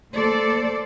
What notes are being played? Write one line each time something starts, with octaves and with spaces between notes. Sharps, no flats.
A3 A#3 A4 C5 D5